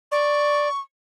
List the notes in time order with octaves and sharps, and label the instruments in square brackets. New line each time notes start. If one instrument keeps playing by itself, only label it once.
[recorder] D5 [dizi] C#6